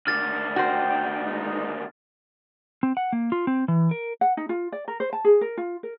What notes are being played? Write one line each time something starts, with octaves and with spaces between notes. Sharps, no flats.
D#2 D3 F6 A6
F#4 C5 G5
E2 G#3 D#4
C4
F#5
A#3
F4
C4
E3
A#4
F#5
D#4
F4
D5
A#4
C5
A5
G#4
A#4
F4
A#4